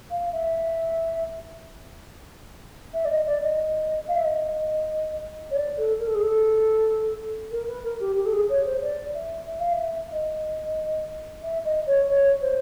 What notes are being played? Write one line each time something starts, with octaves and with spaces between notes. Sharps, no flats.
F5
E5
E5
D5
D#5
D5
D#5
F5
E5
D#5
C#5
D5
A4
A#4
A4
G#4
A4
A#4
B4
A#4
G4
G4
A4
G#4
C#5
C5
D5
E5
E5
F5
E5
D#5
E5
D#5
C#5
C#5
C5